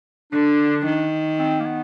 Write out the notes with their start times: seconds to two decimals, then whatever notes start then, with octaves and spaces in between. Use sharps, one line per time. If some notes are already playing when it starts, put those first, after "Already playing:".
0.32 D3 D4
0.86 D#3
1.39 C4
1.61 A#3
1.65 B3